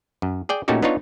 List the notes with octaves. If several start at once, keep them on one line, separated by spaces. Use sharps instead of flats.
F#2
G#4 D5 G5
A#2 A3 C#4 D#4 F#4 G4
B3 D4 D#4 F4 C#5